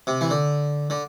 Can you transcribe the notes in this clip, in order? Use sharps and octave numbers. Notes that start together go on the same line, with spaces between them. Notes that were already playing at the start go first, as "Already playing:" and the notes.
C3
E3
D3
D3